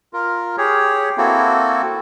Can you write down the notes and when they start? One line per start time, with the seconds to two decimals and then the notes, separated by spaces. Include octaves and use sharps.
0.13 F4 A#4
0.58 G4 G#4 C#5
1.18 A#3 C4 E4 F#4 A4